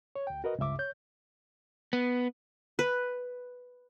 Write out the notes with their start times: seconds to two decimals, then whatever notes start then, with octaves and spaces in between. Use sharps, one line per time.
0.16 C#5
0.27 D2 G5
0.44 F#4 A#4 B4 D#5
0.58 C#2 G2 C#3 E5 D6
0.79 C#5 G6
1.93 B3
2.79 B4